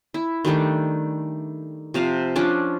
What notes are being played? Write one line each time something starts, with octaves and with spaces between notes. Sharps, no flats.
E4
D#3 G3 A3 D4
C3 F3 F5
F3 C#4 D4 D5